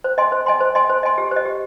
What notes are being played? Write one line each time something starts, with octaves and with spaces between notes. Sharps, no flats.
C5
D#5 G#5 C6
C5
D#5 G#5 C6
C5
D#5 G#5 C6
C5
D#5 G#5 C6
G4
C5 D#5
G4